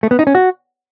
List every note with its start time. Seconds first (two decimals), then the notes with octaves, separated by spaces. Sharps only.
0.03 A3
0.11 B3
0.19 D#4
0.27 C#4
0.35 F#4